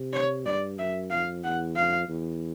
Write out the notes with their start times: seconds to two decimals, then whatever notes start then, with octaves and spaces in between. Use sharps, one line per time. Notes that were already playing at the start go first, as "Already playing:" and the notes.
Already playing: C3
0.13 C#5
0.45 G2 D5
0.78 F#2 E5
1.11 F2 F5
1.44 E2 F#5
1.76 F2 F5
2.09 E2